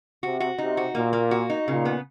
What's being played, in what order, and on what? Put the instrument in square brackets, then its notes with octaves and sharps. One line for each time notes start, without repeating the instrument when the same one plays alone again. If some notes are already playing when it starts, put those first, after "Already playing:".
[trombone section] C3 [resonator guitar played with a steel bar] F#4
[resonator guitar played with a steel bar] F#4
[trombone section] C3 [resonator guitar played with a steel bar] D#4
[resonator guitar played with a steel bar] F#4
[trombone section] A#2 [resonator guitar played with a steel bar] A#3
[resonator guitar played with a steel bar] A#3
F#4
D#4
[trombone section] A#2 [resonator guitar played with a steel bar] C#3
[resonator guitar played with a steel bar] B3